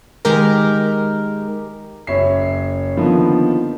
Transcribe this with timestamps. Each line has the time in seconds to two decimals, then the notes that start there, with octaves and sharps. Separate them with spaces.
0.25 D#3 G#3 G4 A#4
2.07 F#1 C#5 E5 C7
2.97 D3 D#3 F3 A#3 B3